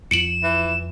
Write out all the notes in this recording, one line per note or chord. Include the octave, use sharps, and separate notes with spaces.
F2 F3 C#7 D7 E7 F#7
E3